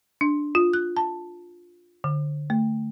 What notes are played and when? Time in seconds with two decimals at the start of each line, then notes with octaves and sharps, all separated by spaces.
0.21 D4
0.55 F4
0.73 F#6
0.97 A5
2.04 D3
2.50 A3